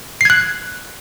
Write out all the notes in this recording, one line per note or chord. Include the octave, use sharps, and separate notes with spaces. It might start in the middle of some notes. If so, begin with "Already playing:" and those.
F#6 G#6 C7